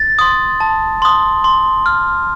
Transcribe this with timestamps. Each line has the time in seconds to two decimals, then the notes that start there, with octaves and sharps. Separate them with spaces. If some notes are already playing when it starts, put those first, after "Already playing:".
Already playing: A6
0.19 C6 D#6
0.60 A5
1.02 C6 D#6
1.44 C6
1.86 F6